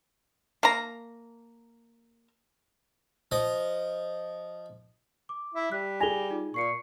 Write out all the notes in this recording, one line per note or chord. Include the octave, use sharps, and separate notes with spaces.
A#3 A#5
F3 D#5
D6
E4
G3 F#6 B6
G#4 G#5 A#6 F7 G7
D#4 F4
A#2 C#6 C7 C#7